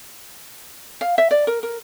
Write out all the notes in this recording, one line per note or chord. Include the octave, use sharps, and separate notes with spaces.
F5
E5
D5
A#4
A#4